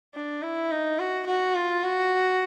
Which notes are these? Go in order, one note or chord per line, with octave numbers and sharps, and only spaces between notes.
D4
E4
D#4
F#4
F#4
F4
F#4